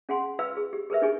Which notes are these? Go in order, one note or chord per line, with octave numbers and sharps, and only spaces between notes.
C#4 G#4 F5 F#5 G#5 C6
F4 B4 F5 G5 E6
G#4
G4
G#4 A#4 B4 E5
D4 D#4 G4 G#4 G#5 C#6